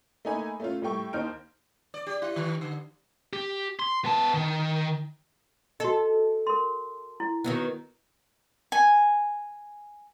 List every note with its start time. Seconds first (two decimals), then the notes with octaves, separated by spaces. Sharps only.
0.25 A3 A#3 D#4 G#5 B5
0.60 A3 C#4 F4
0.82 A2 G3 A3 G5 C#6
1.13 D#2 D#4 C5 F6 G6 D7
1.94 D5
2.07 G4
2.22 E4
2.36 D#3
2.61 D3
3.33 G4
3.80 C6
4.05 B3 A5
4.34 D#3
5.80 F#4 A4 D#5
6.47 A#4 C6
7.20 E4
7.44 D#3 F#3 B3
8.72 G#5